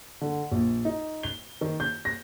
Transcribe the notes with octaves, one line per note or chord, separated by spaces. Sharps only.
D3
A#1
D#4
G7
D#3
G6
A#6